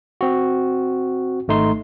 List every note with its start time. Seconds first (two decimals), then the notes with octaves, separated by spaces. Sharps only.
0.21 C4 F#4
1.48 G#1 A3 D#4 C6